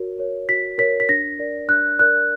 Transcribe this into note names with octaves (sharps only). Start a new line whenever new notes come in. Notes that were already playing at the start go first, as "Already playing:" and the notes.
Already playing: F#4 A#4 C#5
A#4 C#5
F#4 B6
A#4 C#5 B6
B6
D4 A#6
A#4 D5
D4 F#6
A#4 D5 F#6